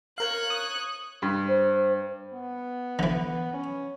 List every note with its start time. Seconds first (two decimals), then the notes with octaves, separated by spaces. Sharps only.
0.18 A#4 C#5 F5 F#6
0.50 D#6
1.22 G2
1.48 C5
2.33 B3
2.99 D3 E3
3.53 C#4